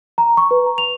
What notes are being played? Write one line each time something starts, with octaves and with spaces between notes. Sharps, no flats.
A#5
C#6
B4
A#5
F7